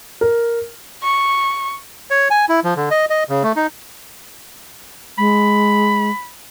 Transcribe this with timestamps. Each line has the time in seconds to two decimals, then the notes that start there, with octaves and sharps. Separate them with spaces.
0.21 A#4
1.03 C#6
2.10 C#5
2.30 G#5
2.49 E4
2.64 F3
2.76 D3
2.91 D#5
3.10 D#5
3.29 C#3
3.43 A3
3.56 D#4
5.18 G#3 B5